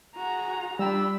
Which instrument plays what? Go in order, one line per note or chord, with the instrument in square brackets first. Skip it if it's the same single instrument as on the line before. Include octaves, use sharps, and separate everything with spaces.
[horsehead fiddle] F#4 G#4 [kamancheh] A#5
[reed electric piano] G3 G5 [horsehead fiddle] D4 B5 [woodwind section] F4 E6